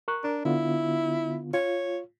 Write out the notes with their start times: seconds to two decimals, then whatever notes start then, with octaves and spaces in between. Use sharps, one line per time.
0.08 A#4 C#6 F#6
0.24 D4 A#4
0.45 D3 B3 E4 F4
1.54 F4 C#5